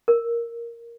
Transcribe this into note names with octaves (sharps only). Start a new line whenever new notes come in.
A#4